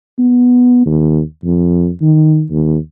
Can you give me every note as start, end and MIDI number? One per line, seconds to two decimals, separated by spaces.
0.19 0.81 59
0.86 1.21 39
1.44 1.90 41
2.02 2.45 51
2.51 2.77 39